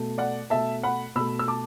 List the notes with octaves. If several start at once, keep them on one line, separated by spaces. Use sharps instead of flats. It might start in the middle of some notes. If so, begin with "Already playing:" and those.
Already playing: B2 A3
D5 F#5
B2 A3 E5 A5
F#5 B5
B2 A3 B5 E6
E6
A5 D6